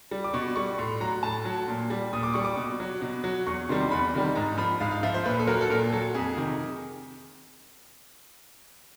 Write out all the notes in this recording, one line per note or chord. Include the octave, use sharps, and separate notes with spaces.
G3
D6
B2 C#6
G3 C#6
A2 C6
F#3 A#5
A2 A5
F#3
A#2
G3
A#2 D#6
D6
G3 C#6
D6
B2
F#3
B2
F#3
E2 C#6
C3 D#3 G3 C6
C6
E2 B5
C3 D#3 G3
G#2 A#5
F3 B5
G#2 F5
F5
F3 E5
C5
A#2 B4
A4
F#3 A#4
A4
A#2 A#4
F#3 A4
F2 G#4
C3 D#3